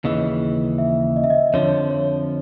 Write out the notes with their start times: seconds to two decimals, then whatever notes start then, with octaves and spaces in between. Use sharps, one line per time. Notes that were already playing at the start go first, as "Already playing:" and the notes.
0.04 D#2 C#3 E3 D#5
0.78 E5
1.16 D#5
1.24 E5
1.30 D#5
1.54 F2 D3 F3 C#5
1.90 C#5